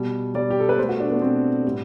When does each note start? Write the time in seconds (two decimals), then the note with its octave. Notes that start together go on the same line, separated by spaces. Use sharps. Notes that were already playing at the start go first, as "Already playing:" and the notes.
Already playing: B2 G3
0.35 B2 G3 D5
0.50 G4
0.60 A4
0.69 B4
0.78 B2 A3 C5
0.89 F#4
1.00 D4
1.11 B3
1.22 B2 A3 C4
1.65 A2 G3